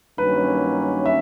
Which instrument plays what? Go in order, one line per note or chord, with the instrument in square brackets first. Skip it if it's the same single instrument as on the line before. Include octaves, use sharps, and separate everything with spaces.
[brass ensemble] G2 D#3 F#3 A#3 C#4 [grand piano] B4
[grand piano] E5